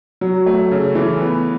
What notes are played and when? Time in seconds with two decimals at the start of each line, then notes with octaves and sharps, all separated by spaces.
0.21 F#3
0.46 A3
0.71 C#3
0.95 E3
1.20 B3